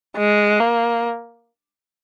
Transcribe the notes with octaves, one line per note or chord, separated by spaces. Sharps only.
G#3
A#3